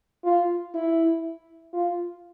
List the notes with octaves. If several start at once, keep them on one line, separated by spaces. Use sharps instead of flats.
F4
E4
F4